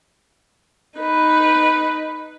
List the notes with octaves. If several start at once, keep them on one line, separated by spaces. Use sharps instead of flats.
D#4 B4